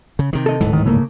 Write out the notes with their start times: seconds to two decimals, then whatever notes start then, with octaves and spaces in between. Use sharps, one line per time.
0.19 C#3
0.33 C3 D#3
0.46 A4 D#5
0.60 D1 G#2 E3
0.73 D#3
0.86 C#3 A3 A#3